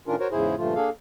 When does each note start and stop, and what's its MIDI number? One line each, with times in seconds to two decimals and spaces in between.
0.07 0.16 45
0.07 0.16 51
0.07 0.16 61
0.07 0.16 62
0.07 0.16 65
0.07 0.16 70
0.19 0.28 66
0.19 0.28 70
0.19 0.28 72
0.19 0.28 73
0.31 0.55 40
0.31 0.55 44
0.31 0.55 49
0.31 0.55 64
0.31 0.55 68
0.31 0.55 72
0.58 0.74 43
0.58 0.74 46
0.58 0.74 50
0.58 0.74 53
0.58 0.74 57
0.58 0.74 65
0.75 0.90 58
0.75 0.90 62
0.75 0.90 68
0.75 0.90 69
0.75 0.90 77